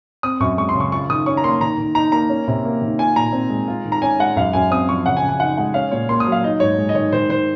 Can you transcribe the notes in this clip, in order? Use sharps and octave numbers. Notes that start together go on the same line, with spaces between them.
C4 D#6
F#2 C#6
G#3 C#6
C6
C#3
C#6
F4 C#6
D#3 D#6
C#4 C#6
A#5
A#3 C6
D#3 A#5
D#3
D#4 A#5
A#3 A#5
C#4
C3
A#3
D#3
F4 G#5
A#2 A#5
C4
G#3
F4
D#3
A#5
C#4 G#5
G#3 F#5
F#2 F5
F#2 G#5
C4 D#6
F3 C#6
C#3 F#5
G#5
C#3
G#5
D#4 F#5
G#3 F#5
C#4 F5
A#2 C#5
A#3 C6
D#6
F#3
F5
D#4 D#5
G#2 C#5
G#3
D#5
D#3 C#5
D#3 C5
D#3 C5